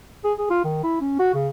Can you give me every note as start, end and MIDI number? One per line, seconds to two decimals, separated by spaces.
0.24 0.33 68
0.39 0.50 68
0.50 0.63 65
0.65 0.81 51
0.84 0.99 64
1.01 1.17 61
1.19 1.34 66
1.35 1.49 49